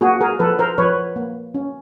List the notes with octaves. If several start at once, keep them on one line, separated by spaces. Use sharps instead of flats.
A#3 F#4 G#4
G#4 A#4
F3 A4 B4
A#4 C5
F3 B4 C#5
A#3
C#4